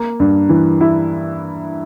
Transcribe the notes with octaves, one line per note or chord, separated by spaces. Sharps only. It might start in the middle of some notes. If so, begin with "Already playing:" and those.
Already playing: A#3
G2
E3
E4